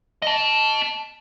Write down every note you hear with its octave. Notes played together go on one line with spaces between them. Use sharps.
D#5 A5